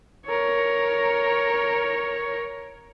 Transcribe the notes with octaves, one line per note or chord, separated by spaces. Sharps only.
A#4 C#5